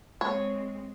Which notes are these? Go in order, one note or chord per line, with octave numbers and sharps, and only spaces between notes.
G#3 C4 C#5